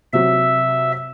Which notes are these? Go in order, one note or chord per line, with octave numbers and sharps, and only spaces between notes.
C3 F#3 E5